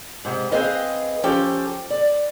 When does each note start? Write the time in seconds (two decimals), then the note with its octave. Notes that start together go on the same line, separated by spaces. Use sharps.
0.25 G#2 C3
0.52 C4 G#4 B4 D#5 F5
1.23 F3 C#4 G4 A4 G5
1.90 D5